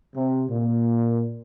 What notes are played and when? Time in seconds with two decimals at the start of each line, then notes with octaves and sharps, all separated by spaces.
0.15 C3
0.49 A#2